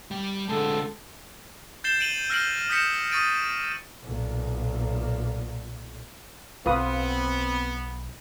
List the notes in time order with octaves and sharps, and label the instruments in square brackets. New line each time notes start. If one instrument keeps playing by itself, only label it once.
[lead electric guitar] G3
[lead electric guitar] D3 G#3 [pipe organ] A4
[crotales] G6 A6 C7 E7 G7
D7 D#7 F#7 G7
E6 F6 A#6 C7 D7 F#7
D#6 G6 A#6 B6 C#7 E7
C#6 D#6 A6 D7 D#7
[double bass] B1 A#2
[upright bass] B1 [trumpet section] B3 [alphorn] C4 [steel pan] F4 B4 D#6